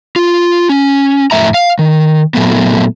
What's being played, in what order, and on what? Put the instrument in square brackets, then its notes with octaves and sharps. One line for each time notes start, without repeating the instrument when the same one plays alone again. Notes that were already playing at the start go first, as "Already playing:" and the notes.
[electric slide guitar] F4
C#4
F2 A2 E5 A#5
F5
D#3
A#2 F#3 A3 B3